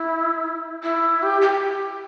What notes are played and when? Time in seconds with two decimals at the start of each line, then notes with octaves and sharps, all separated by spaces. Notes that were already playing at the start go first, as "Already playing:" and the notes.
Already playing: E4
0.83 E4
1.22 G4
1.42 G4